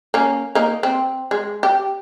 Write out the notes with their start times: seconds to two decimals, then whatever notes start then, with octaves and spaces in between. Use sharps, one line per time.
0.14 A#3 C#4
0.55 A#3 D#4
0.83 C4
1.31 G#3
1.63 G4